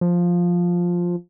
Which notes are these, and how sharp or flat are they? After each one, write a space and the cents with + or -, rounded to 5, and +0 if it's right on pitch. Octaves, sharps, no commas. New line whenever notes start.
F3 +5